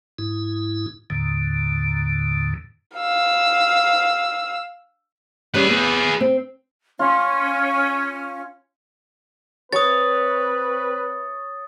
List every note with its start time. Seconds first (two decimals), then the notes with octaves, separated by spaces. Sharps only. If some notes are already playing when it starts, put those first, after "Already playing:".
0.19 G#2 E4
1.10 D#2 A2 D3
2.98 F5 E6
5.54 G3 C#4 G#4 B4
5.70 B3
6.21 C4
6.99 C#4 F4
9.73 C4 B4 C#5 D#6 A6